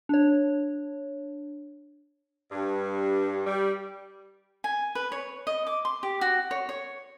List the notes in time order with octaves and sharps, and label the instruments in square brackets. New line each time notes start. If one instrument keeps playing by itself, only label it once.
[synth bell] D4 C#5
[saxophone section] G2
G3
[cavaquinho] G#5
B4
C#5
D#5
D6
C6
G4
F#4
C#5
C#5